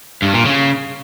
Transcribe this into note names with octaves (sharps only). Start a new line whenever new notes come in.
G2
A#2
C#3